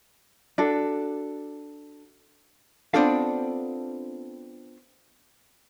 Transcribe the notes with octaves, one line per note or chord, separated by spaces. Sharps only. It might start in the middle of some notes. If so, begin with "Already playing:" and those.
D4 F#4 A4
B3 C4 D4 F4 A4 F5